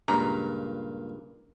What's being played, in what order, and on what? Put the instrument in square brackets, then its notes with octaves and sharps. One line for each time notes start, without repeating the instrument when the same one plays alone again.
[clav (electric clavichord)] C#2 G2 [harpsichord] A#2 A#3 [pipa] A#5